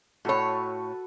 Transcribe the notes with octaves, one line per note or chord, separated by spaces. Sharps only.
A2 F#4 A4 B4 C#5